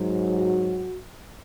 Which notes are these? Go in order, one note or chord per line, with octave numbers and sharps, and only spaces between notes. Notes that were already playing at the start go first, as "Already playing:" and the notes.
Already playing: G#2 F#3
F#4